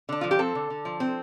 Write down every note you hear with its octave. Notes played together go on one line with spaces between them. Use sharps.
D3 D4
F3 F4
G4
C4 A4
D3
D3
F3
C4